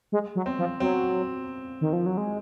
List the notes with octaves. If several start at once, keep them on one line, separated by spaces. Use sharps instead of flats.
G#3
F#3
C4
F3
F#3 C4
D#3
F3
F#3
G#3